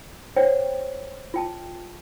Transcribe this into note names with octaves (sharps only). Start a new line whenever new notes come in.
C5 C#5 F#5 G5
F4 G5 A5